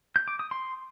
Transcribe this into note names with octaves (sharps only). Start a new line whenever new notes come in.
G6
D6
D#6
C6